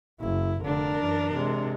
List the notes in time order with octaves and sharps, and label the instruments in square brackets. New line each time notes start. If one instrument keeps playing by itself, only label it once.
[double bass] F#1 E4
[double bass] F1 D3 [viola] D4 A#4
[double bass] F#2 E3
C3 G#3